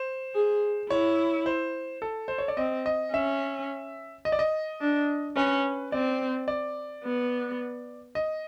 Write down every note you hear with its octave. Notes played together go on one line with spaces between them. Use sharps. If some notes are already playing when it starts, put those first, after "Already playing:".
Already playing: C5
G#4
E4 C#5
C5
A4
C5
C#5
D5
C4 D#5
D#5
C#4 E5
D#5
D5
D#5
D4
C#4 B4
C4 D5
D5
B3
D#5